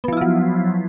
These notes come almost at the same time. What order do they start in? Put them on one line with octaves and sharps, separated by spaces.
B3 F3 E4 F4 F#3